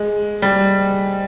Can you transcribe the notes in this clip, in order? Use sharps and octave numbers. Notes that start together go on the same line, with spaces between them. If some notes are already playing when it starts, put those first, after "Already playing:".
Already playing: G#3
G3